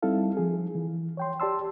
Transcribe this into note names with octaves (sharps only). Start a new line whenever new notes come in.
G3 C4 D#4 E4 A4 F5
F3 G#4
E3
C#5 G5 C6
G4 D5 A5 C6 E6